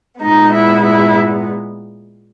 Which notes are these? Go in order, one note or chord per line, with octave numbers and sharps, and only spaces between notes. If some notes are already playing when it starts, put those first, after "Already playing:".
A#2 G#3 B3 D#4
E4
E4